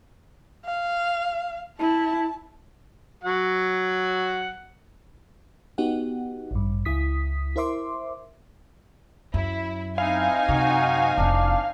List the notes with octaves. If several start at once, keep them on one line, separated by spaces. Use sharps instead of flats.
F5
E4 A5
F#3 F#5
B3 D#4 F#4 G4 F#5
A1 G2
C#2 E4 D#6 B6
E4 A#4 C5 E5 C6 D6
F#2 E4
C4 D#4 E4 F5 G#5
F#2 C3 F#4
F1 D4 E4